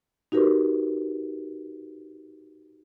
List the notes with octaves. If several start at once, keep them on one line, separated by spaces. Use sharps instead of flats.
D#4 F#4 G4 A#4 B4